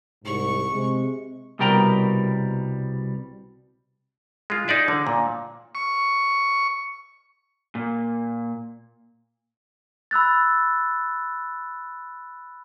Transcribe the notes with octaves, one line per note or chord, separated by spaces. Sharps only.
C2 G#2 C#6
C3 G#3
C2 B2 G3 A#4 G5 A#5
G#3 F4
D#4 G#4 D5 E5
D3
A#2
C#6
A#2
B5 E6 F#6 A6